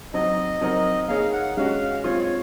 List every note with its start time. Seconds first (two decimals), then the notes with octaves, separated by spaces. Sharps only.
0.14 F#3 C4 D#4 D#5
0.61 F#3 C4 D#4 A#4
1.08 A#3 D#4 G#4 C#5 F5
1.33 F#5
1.56 G#3 C#4 F#4 F5
2.04 G#3 C4 F4 C#5
2.20 C#5